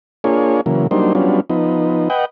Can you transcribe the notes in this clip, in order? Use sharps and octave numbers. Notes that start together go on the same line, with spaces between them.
A#3 D4 F4 G#4 C#5
C#3 E3 F#3 A#3
F#3 G3 A#3 D4 D#4 C5
F#3 G3 B3 C#4 D4 F4
F3 B3 D#4
B4 D#5 F#5 G5